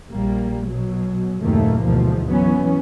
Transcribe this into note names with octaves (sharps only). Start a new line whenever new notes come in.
A#1 G3 A#3
B2 F#3
F#1 D#2 A#2 D#3 A3 A#3
D2 G#2 B2 E3 F3
E3 F#3 B3 C#4